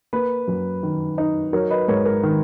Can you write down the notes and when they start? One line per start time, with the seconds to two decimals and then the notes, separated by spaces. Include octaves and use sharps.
0.13 A#3 B4
0.48 F#2
0.83 D#3
1.18 D#4
1.53 F#3 A#4 C#5
1.70 B4 D#5
1.88 G#2 A#4 C#5
2.05 A#4
2.23 D#3